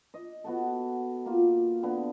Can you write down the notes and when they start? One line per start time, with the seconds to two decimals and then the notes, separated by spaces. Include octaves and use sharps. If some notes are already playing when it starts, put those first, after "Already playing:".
0.14 D#5
0.44 B3 F#4 A4
1.26 A#3 F4
1.83 D3 B3